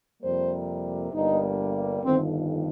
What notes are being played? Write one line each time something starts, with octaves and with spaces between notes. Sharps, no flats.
F2 C3 G3 A#3 C5
G1 G2 G3 A#3 D#4
G1 F2 D#3 C4